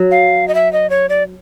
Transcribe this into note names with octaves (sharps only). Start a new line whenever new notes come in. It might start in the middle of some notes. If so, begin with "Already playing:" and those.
Already playing: F#3
F5
D#5
E5
D#5
C#5
D5